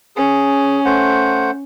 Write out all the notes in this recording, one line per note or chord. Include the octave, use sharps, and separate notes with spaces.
C#4 G#4
A3 C5 F#5